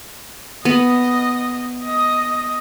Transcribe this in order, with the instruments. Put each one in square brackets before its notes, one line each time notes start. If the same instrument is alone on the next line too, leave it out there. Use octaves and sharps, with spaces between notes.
[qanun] B3 [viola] D#5
[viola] D#5